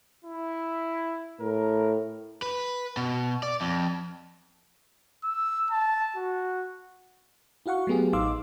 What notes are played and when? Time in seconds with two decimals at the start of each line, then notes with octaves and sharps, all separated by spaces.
0.25 E4
1.41 A2 A#4
2.42 B4
2.97 B2
3.43 D5
3.61 F2
5.24 E6
5.71 A5
6.16 F#4
7.66 E4 F#4 F5 F#5 C#6
7.87 F#3 A3 B3 G4 G#4
8.13 A1 D#4 F5 C6 D6 E6